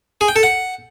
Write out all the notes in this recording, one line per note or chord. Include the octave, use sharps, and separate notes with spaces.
G#4
G5
A4
F#5